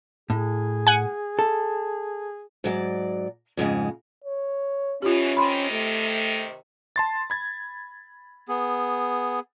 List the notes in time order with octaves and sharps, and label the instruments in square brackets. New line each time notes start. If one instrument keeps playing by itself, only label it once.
[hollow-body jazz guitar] A2 [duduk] G#4
[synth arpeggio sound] F#5 G#5
[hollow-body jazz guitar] A4
[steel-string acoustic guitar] G#2 F#3 D5
F2 G#2 C#3 G#3
[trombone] C#5
[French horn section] B2 D#3 E3 [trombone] C#4 [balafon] F4 G4
[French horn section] C3 D#3 [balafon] B5 C6
[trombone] A3
[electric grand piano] A5 C6 A6
B5 G#6 A6
[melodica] B3 G#4